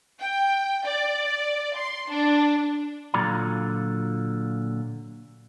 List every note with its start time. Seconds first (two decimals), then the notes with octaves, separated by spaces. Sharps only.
0.20 G5
0.85 D5
1.76 C6
2.10 D4
3.14 A#2 D3 F#3 F4 D5 A#5